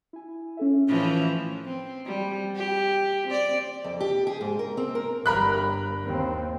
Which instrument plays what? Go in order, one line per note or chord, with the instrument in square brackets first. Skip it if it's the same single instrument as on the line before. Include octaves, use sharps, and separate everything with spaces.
[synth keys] E4 G#5
C#4 A4 E5
[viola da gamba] A2 E3 F3
C4
G3
G4
C4 D5
[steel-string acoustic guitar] F2
G4
G#4
G#2
A#4
C4
A#4
[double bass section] G1 G2 [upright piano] A#4 B5 F#6
[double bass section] D#2 C4